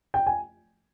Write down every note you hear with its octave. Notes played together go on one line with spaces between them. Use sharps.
G5
G#5